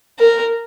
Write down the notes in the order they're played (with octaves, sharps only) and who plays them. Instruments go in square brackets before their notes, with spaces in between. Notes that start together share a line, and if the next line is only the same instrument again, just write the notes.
[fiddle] A#4